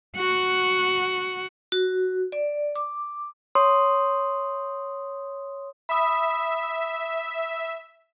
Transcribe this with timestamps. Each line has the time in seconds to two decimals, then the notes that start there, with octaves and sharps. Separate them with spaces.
0.18 F#4 F#5
1.72 F#4
2.32 D5
2.76 D6
3.55 C#5 C6 D#6
5.89 E5 B5 D#6